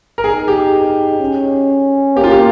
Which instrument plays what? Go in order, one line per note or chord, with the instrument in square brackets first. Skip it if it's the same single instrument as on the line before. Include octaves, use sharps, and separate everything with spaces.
[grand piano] A#4
[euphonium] D#4 [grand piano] G#4
[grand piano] G4
[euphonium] C#4
[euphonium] A#3 [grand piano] G4
[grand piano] F4
G4